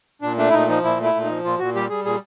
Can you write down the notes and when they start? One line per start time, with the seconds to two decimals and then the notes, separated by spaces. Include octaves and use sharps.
0.22 A#2 D4
0.37 A3 D4
0.49 E4
0.53 A#2 D#4
0.68 F3 D#4
0.83 A#2 E4
0.99 A3
1.04 E4
1.14 A#2
1.24 D#4
1.30 F3
1.44 A#2 F4
1.59 A#2 F#4
1.75 G3 G4
1.90 G3 G#4
2.05 A#2 G#4